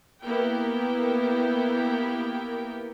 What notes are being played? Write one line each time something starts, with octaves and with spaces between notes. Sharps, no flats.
A#3 B3 E4 G4 A#4 G5